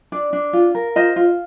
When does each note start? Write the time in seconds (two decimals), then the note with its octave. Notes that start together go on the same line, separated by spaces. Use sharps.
0.12 D4 D5
0.33 D4
0.53 F4
0.75 A#4
0.96 F4 C5 D#5
1.16 F4